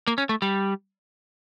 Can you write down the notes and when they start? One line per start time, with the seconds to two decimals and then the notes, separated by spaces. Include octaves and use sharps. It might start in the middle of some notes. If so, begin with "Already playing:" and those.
0.07 A#3
0.18 C#4
0.29 A3
0.42 G3